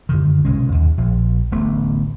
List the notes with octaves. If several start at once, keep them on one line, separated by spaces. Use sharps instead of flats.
F#2 D3 D#3
B1 C3 G#3 C#4
D#2
A#1 F3
D1 A1 A3 B3